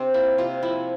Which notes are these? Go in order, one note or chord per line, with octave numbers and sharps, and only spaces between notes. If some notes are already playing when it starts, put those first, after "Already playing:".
Already playing: C3 C4 D4
A#3 E4
C3 F4
F3 E4